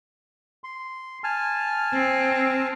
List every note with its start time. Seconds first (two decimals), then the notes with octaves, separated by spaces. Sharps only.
0.64 C6
1.24 G#5 A5 F6
1.93 C4